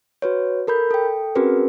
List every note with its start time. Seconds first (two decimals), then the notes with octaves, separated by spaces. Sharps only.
0.22 F#4 B4 C#5
0.67 A4 A#4 B5 G6
0.91 A4 G5
1.35 C4 C#4 F#4 G#4 A#4 B4